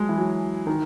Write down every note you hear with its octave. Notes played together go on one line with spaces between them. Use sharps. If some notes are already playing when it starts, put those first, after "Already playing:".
Already playing: F#3 G#3
E3
F#3
D#3